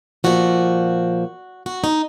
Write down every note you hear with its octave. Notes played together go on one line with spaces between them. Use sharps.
A#2 F3 F#4
F#4
D#4